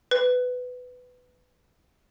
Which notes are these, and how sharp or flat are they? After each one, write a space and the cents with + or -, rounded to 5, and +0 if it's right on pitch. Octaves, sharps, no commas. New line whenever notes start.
B4 +15